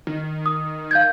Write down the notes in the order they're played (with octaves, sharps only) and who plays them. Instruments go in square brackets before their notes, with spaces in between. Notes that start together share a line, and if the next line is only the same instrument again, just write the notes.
[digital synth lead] D#3
[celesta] D#6
F5 G6 G#6